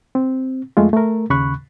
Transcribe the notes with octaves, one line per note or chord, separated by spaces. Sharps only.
C4
F2 G#3 A3 F4
A3 A#4
D#2 C#3 B5 C#6 F#6